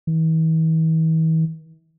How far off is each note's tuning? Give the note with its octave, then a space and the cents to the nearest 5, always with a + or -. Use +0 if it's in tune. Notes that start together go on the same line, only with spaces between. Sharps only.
E3 -45